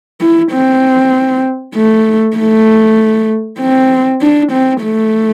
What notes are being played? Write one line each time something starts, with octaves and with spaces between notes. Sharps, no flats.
E4
C4
A3
A3
C4
D4
C4
A3